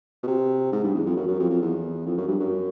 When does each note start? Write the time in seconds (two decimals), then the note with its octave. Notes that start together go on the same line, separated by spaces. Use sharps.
0.23 B2
0.27 C3
0.73 G#2
0.84 G2
0.95 E2
1.06 F2
1.17 F#2
1.28 F#2
1.39 F2
1.50 F2
1.62 E2
2.06 F2
2.17 F#2
2.28 G2
2.40 F#2